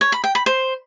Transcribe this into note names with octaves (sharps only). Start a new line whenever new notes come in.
C#5
B5
G5
B5
C5